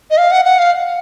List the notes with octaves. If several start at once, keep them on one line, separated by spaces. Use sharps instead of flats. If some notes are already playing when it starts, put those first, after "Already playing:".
D#5
F5
F#5
F#5
F5